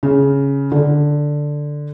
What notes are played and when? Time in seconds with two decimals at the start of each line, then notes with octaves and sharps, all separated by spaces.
0.03 C#3
0.72 D3